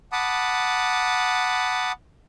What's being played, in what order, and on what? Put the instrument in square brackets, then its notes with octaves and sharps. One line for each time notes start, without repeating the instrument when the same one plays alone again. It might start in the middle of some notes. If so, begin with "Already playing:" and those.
[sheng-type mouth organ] F#5 A5 B5 D6 D#6